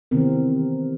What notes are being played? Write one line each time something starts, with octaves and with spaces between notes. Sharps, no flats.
C3 D#3 E3 B3 C4 A#4